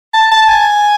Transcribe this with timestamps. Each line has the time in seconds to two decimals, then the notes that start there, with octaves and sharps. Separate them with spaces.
0.14 A5
0.32 A5
0.49 G#5